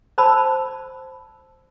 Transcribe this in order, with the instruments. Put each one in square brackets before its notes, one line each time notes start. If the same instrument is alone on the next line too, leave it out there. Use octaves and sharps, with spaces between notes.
[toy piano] C5 D5 A5 B5 E6